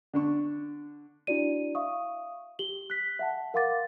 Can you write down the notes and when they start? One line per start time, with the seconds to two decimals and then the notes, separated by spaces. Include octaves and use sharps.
0.13 D3 D4 C#6
1.27 D4 E4 F#4 D5 D#7
1.75 E5 F5 C#6 D#6
2.59 G4 F#7 G7
2.90 F#6 B6
3.19 E5 F#5 A5
3.54 A#4 F5 F#5 C6 D6 A6